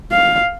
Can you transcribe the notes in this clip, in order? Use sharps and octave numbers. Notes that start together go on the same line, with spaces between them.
F5